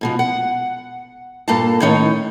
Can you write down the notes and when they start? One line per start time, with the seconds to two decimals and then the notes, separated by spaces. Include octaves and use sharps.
0.01 G#2 B2 F3
0.19 F#5
1.48 G2 A#2 A#3 A4 F5 A5
1.81 A2 D#3 C#4 D#4 C#5